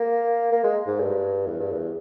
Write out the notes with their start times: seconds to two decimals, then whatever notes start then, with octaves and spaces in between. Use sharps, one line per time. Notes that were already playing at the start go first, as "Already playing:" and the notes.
Already playing: A#3
0.52 A#3
0.64 G#3
0.87 G#2
1.00 G2
1.47 E2
1.60 G2
1.72 E2